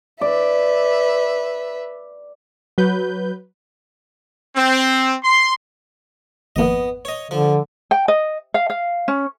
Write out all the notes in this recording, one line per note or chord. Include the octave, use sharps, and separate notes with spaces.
B4 D5 E5
F#3 B4 G6
C4
C6
G#1 F2 A#3 B3 D#5
C#5 D#5
D3 F3
G5
D#5
F5
F5
C#4